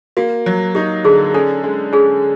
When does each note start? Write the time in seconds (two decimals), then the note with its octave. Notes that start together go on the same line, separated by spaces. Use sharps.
0.17 A#3 F#4
0.46 F#3
0.75 D#4 G4
1.05 D3 G#4
1.34 C#4 A4
1.64 G#3
1.93 C#4 G#4